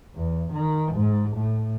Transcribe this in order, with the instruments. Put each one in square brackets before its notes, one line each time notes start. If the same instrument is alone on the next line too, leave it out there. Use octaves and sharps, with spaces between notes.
[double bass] E2
D#3
G#2
A2